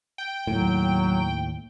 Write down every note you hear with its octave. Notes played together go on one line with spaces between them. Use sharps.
G5
D#2 A2 F#3